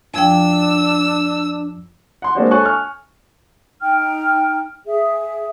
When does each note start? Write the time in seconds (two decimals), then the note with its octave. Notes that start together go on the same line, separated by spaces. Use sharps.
0.14 F2 F3 D4 G5 E6
2.22 F#5 C6
2.35 G#3 A#3 C4 D4 F#4 C5
2.51 A4 C#5 G#5 A5 C#6 F#6
2.65 G#5 C#6 F6
3.81 D#4 G5 F6
4.86 G#4 E5